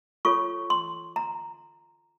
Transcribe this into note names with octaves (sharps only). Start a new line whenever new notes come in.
F4 A4 C#5 C#6
C6
A#5